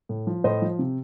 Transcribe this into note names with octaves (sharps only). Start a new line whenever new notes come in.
A2
F3
A2 C5 D#5
F3
C3